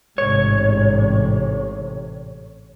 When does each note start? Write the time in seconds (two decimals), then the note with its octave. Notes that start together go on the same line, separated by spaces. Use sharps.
0.18 A1 G#2 C3 C#5